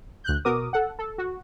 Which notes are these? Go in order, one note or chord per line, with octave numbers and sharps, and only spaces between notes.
D2 F#6 G6
B2 F#4 A#4 D6 D#6
A4 F#5
A4
F#4